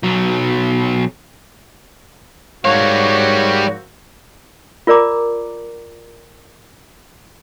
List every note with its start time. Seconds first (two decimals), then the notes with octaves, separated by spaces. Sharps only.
0.03 B1 F#3
2.65 G#2 G3 A#3 C4 F#4 C#5 F5
4.87 F4 A#4 D5 A#5 D6